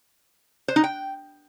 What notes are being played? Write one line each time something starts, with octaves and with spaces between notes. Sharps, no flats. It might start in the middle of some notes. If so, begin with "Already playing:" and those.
C5
D#4
G5